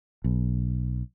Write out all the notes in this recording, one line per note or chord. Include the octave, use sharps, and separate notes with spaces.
B1